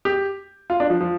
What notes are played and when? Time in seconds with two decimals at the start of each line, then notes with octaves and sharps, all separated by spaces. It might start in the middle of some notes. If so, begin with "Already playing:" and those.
0.05 G4
0.70 F4
0.80 D4
0.90 F3
1.01 F3